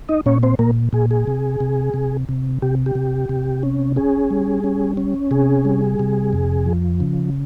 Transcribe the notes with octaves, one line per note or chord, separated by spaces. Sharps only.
D#4 D#5
A#2 C#4 C#5
C4 C5
A#2 A#3 A#4
A#2 G#4
G#4
C3
C3
C3
C3
C3 G4
G4
C3
C3
C#4
C#4 G#4
G3
C#4
C#4
C3 G#4
G3
C3
F2
F3
C#3